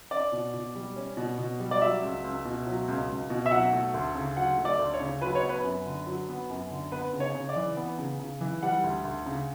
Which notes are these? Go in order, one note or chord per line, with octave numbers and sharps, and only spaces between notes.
C#4 D5
B2
B2
G3
C#4
B2
B2
G3
D5
F#3 E5
C#2
C#2
B2
F#3
C#2
C#2
B2
E5
F#3 F#5
A3
D2
C#3
F#3 F#5
A3
D5
D2
C#5
C#3
F#3 B4
C#5
B3
B4
F#2
D3
F#3
B3
F#2
D3
B3 B4
C#3
C#5
C#3
D5
E3
B3
C#3
C#3
E3
G3 F#5
D2
D2
C#3